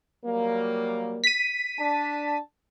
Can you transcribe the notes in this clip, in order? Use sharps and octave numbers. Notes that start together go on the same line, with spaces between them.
F#3 G3 A#3
B6 D#7
D4 A5